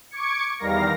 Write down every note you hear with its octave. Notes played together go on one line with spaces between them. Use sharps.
C#6 D6 G#6 C#7
E2 D#3 G3 A#4 F5 A#6